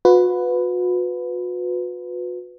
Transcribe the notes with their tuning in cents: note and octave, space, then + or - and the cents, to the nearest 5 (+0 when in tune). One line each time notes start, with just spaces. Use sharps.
F#4 -40 B4 +10